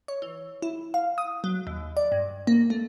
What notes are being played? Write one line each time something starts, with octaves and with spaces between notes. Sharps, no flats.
C#5
E3
E4
F5
D#6
F#3
D#2
D5
G2
A#3
A3